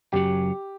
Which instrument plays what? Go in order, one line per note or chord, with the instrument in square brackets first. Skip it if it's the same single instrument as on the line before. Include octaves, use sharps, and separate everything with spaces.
[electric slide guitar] F#2 C#3 F#3 [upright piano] G4